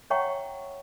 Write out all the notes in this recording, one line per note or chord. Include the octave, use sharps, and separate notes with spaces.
C#5 E5 F#5 G5 A#5 C#6